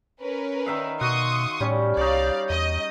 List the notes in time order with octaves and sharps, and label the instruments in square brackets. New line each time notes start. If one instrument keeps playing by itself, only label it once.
[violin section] C#4 A#4 B4
[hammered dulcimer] D#3 E5 F5
[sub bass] B2 [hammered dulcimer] F#4 [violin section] C6 C#6 D#6
[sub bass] A2 [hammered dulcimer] G3 C#4
[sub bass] C2 [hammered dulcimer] D#4 C#5 [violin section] D5 F5
[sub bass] E2 [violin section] D#5